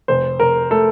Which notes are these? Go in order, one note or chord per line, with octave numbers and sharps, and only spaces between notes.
F1 C5
F1 A#4
A3 A4